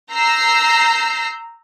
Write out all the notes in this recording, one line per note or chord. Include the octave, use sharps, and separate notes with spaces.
A#5 E6 G6 A#6 C7